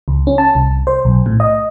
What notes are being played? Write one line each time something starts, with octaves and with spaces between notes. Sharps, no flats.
C#2
C#4
A5
C2
C5
B1
A2
D#5